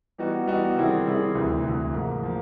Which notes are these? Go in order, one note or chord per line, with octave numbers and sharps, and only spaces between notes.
E3 G3 B3 D#4 F#4
E3 G3 B3 D#4 F#4
D#3 G3 C4 E4 G#4
D#3 G3 C4 E4 G#4
D2 C3 E3
D2 C3 E3
G#2 F3 A#3
F3 A#3